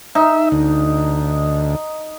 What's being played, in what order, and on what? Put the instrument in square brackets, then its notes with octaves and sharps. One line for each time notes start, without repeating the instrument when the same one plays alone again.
[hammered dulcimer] D#4 [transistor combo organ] E5
[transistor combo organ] D2